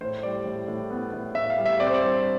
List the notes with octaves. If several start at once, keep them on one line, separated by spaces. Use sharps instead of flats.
A2 C5
G3 D5
A2
A2
B3
A2
A2 E5
F5
G3
E5
C4 D5
C5
D5
G2 C5